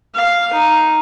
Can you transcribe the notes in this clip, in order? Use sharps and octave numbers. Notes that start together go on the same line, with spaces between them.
F5
D#4